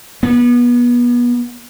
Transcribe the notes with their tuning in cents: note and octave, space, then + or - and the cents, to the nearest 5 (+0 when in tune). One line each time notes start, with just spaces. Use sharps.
B3 -30